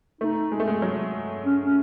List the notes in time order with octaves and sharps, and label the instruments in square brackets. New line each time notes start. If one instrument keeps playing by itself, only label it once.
[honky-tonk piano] A3 [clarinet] D#4
[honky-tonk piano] G#3
A3
G#3
F#3
[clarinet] C#4
C#4